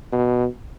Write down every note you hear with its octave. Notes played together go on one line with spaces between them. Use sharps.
B2